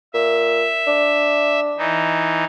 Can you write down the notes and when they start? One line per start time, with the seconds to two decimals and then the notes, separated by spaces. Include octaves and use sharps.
0.14 A#2 E5
0.87 D4
1.78 E3 D#4